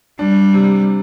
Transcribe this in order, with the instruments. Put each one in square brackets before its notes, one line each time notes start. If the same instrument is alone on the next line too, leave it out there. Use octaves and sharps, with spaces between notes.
[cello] G3 [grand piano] D4
[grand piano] C3